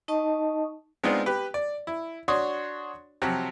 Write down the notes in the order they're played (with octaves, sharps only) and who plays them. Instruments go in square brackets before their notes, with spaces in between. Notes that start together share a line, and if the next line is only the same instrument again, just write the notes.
[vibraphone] D#4 D#5 A5 C#6 D#6
[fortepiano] G#3 B3 C4 D4 D#4 F4
G4 B4
D5
E4
D4 F#4 C#5 C6 C#6 D#6
C3 F3 F#3 G4